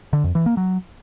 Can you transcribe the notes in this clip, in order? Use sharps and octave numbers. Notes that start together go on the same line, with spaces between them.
D3
F2
E3
A#3
F#3